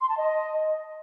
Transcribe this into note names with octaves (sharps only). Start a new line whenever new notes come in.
C6
A5
D#5